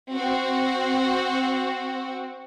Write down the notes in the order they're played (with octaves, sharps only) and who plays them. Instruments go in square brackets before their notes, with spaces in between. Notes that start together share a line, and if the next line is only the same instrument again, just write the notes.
[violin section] C4 F#4